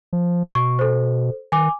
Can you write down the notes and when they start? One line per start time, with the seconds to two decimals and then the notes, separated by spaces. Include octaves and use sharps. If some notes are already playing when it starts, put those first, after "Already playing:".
0.13 F3
0.55 B2 C#6
0.79 A4 C5
1.52 D#3 G#5 D6